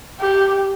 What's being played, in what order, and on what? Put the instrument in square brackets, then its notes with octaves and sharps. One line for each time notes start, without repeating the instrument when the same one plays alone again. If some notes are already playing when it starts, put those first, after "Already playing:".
[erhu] G4